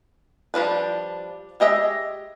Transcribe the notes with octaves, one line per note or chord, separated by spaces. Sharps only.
F3 G3 D4 B4
G#3 G4 D#5 E5